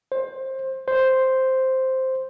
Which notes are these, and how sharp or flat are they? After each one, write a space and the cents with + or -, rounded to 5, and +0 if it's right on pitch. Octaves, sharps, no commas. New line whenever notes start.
C5 +20
C5 +0